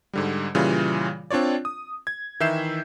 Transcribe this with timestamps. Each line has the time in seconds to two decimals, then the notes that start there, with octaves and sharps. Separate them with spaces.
0.13 G#2 D3 G3
0.55 A#2 C#3 E3 G3 F4
1.31 C4 D4 F4 C#5 D5
1.65 D#6
2.07 G#6
2.40 D#3 E3 E5 G6 C7 E7